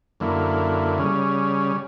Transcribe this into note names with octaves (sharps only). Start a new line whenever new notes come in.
F#2 D3 A#3 E4
C#3 G3 C#4